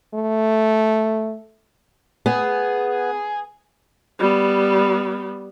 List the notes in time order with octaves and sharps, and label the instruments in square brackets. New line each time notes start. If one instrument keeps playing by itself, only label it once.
[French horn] A3
[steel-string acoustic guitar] B3 [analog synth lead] G#4
[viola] G3 B3